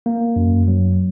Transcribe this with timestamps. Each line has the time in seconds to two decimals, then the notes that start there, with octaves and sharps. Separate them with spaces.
0.06 A#3
0.36 F#2
0.68 F#3